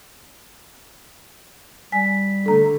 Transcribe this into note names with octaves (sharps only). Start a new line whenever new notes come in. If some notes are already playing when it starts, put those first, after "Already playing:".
G3 G#5 B6
D3 A3 A4 A#5